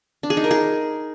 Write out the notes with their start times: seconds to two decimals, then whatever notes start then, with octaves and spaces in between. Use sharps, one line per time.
0.23 D4
0.30 G#4
0.37 D#4
0.44 A#4
0.51 G#4